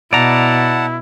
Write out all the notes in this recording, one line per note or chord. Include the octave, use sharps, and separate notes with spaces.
B2 E4 D5 F#5 A5 A#5